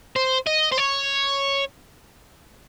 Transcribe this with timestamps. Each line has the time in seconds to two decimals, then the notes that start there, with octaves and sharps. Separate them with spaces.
0.16 C5
0.47 D#5
0.72 C5
0.77 C#5